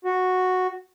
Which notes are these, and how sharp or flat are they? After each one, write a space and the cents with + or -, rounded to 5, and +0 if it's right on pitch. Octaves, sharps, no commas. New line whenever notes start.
F#4 -5